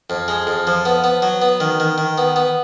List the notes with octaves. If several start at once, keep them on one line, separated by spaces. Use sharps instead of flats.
F2
G#3
F2
F3
B3
B3
F#3
B3
D#3
D#3
D#3
B3
B3